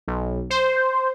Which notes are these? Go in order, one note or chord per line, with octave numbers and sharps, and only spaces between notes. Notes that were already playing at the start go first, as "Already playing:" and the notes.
B1
C5